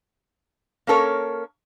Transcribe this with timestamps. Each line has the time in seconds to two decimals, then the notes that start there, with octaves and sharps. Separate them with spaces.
0.87 A#3 C#4 A4 A#4 C#5